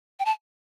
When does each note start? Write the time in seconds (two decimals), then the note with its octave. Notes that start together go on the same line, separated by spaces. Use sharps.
0.20 G5
0.25 A5